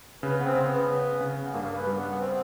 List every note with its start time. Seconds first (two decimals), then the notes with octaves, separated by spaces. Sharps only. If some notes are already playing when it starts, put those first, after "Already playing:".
0.23 C#3 B3
0.39 B3
0.44 C4
0.55 C#3
0.66 B3
0.88 C#3
1.21 C#3
1.54 G2 A#3
1.65 A#3
1.76 B3
1.87 G3
1.97 B3
2.11 B3
2.20 C4